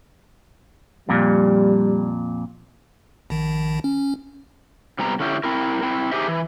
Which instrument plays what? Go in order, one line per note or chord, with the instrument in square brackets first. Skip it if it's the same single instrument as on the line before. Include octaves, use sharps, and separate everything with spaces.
[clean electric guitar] F2 A#2 [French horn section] G3
[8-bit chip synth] A#1 D#3
C#4
[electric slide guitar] C3 G3 B3 A#5
D3 C#4 E4 G4
C4 E4 A#4
C4 E4
D#4 E4 G4 G#4 C5 E5
E3